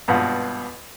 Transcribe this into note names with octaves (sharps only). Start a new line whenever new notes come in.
G#1 G2 B2 F4 F#5